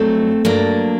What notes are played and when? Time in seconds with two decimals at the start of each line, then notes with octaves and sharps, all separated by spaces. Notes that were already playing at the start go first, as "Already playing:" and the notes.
Already playing: G2 F#3 A3 C4
0.45 G2 F#3 A#3 D4